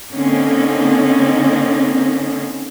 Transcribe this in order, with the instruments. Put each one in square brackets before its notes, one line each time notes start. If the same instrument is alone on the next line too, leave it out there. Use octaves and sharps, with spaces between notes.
[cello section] D3 A#3 C4 C#4 D#4